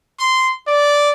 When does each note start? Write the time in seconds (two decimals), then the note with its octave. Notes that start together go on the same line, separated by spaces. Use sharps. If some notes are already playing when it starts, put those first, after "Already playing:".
0.19 C6
0.67 D5